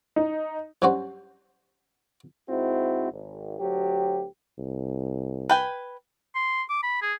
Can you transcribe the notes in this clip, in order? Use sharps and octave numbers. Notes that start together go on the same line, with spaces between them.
D#4
G2 F#3 C#4 F#4 C5
G#2 C4 E4 F#4
G#1
D2 F#3 G4
C2
B4 G5 G#5
C6
D6
B5
G#4